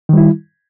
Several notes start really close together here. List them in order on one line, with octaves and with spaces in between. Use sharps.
D#3 G3 E4